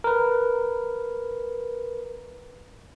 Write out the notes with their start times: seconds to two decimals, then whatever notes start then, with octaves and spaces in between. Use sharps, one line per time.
0.04 A#4 B4